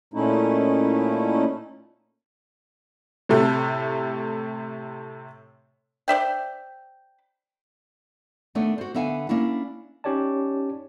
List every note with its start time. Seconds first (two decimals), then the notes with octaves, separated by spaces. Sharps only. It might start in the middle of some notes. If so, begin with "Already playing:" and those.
0.14 A#2 A3 C#4 D#4 E4
3.29 A2 C3 A3
6.08 C5 D5 E5 G5
8.55 D#2 A3 B3 D4 C#5 E5
8.78 F#4 C5
8.95 D3 B3 E5 F5 G#5
9.29 A#3 C#4 D4 E4
10.04 C#4 D#4 G4 C#5 D5 A5